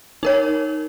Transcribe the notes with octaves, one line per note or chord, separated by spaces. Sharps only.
D#4 A#4 C#5